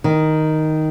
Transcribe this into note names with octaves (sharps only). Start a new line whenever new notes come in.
D#3